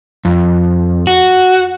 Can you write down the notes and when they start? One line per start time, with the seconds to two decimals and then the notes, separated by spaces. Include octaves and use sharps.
0.25 F2
1.07 F#4